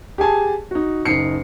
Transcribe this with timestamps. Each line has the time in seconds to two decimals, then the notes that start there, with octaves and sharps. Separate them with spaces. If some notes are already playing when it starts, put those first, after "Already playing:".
0.18 G4 G#4 G#5 A5
0.71 D#4 F#4
1.05 F#1 D#4 C7 C#7